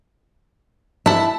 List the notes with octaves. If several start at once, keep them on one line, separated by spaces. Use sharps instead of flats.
E4 E5 A5